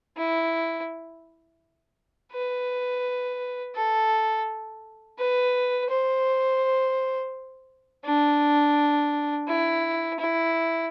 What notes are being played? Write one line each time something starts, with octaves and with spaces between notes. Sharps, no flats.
E4
B4
A4
B4
C5
D4
E4
E4